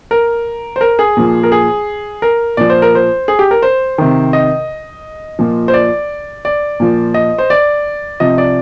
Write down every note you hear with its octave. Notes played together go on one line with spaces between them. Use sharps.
A#4
C5
A#4
G#4
A#2 F3
A#4
G#4
A#4
A#2 F3 D5
C5
A#4
C5
G#4
G4
A#4
C5
C3 D#3
D#5
A#2 F3
C5
D5
D5
A#2 F3
D#5
C5
D5
C3 F3 D#5
D5